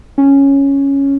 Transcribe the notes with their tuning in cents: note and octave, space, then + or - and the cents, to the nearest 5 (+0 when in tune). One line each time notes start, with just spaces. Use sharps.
C#4 -5